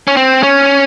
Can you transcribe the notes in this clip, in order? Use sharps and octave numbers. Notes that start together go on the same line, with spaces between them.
C#4
C4
C#4